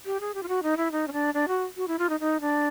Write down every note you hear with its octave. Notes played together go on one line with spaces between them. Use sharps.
G4
G#4
G4
F4
F#4
D#4
E4
D#4
C#4
D4
D4
F#4
F#4
E4
F4
D#4
D#4
D4